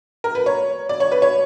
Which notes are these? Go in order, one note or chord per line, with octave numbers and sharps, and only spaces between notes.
A#4
B4
C#5
D5
C#5
B4
C#5